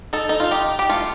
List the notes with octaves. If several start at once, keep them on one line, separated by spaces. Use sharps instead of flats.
D#4 A4
D#4
F4
D#4 G4
G4
A3 F4